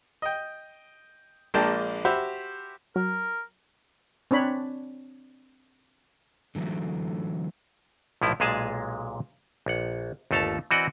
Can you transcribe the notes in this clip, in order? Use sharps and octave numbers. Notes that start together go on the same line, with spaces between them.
D#5 G5
A#1 G#3 A#3 D4 G5 A5
F#4 G4 C5 E5 F#5 B5
F#3 A#4
C4 D4 C#5 B5
D3 E3 F#3 A3
B1 A2 F3 E4
B1 A#2 G#3 G#4 G#5 A5
A#1 F#5
G1 D#2 A3 A4 A5 A#5
E3 C4 F#4 D5 D#5 F#5